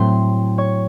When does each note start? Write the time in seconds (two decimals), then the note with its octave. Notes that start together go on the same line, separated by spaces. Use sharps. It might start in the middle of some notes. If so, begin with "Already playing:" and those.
Already playing: A2 F#3 A3 C4 C5 C6
0.58 C#5 C#6